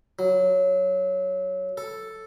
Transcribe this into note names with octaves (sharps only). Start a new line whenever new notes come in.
F#3
A4